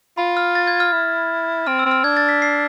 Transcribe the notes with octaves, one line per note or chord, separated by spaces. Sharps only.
F4 B5
F6
A6
G#6
F6
E4
C4 F6
E6
C4
F6
D4 G#6
A6
B6
C7